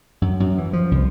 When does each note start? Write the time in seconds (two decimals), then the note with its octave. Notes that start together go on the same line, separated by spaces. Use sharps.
0.22 F#2
0.40 F#2
0.58 E3
0.73 F3
0.91 C2